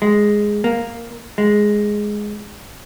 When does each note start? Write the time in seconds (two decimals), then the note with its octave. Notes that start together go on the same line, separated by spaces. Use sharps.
0.02 G#3
0.64 A#3
1.38 G#3